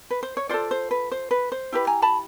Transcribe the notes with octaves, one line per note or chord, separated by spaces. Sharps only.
B4
C5
C#5
F4 A4 C5 D5
C5
B4
C5
B4
C5
E4 G4 B4
G#5 A#5
A5 B5